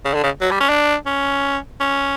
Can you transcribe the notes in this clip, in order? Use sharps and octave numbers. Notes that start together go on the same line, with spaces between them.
C#3
D3
C#3
F#3
G3
C#4
D4
C#4
C#4